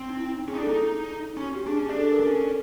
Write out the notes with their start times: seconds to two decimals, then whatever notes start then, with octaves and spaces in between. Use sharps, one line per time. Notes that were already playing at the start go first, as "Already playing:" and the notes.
Already playing: C4
0.10 D#4
0.19 E4
0.48 C#4 G#4
0.54 D#4
0.58 D4
0.62 A4
0.68 D#4
1.37 C#4
1.42 F#4
1.55 G4
1.67 D4 G#4
1.78 C#4
1.89 D4
1.96 A4
2.12 A#4
2.20 D4
2.27 C#4